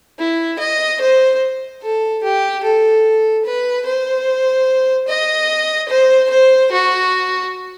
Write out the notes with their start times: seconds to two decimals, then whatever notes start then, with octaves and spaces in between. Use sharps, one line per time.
0.19 E4
0.59 D#5
1.01 C5
1.82 A4
2.23 G4
2.63 A4
3.45 B4
3.86 C5
5.08 D#5
5.89 C5
6.30 C5
6.71 F#4